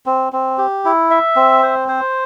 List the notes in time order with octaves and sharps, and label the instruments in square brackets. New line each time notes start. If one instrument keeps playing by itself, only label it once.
[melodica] C4
C4
G4
E4
E5
C4
C5
C5